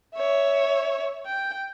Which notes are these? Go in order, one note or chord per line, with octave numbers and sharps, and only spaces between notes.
C#5 E5
G5